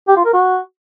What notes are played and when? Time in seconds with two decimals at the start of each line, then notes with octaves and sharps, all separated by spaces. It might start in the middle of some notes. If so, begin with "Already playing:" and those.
0.08 G4
0.17 F4
0.25 A#4
0.34 F#4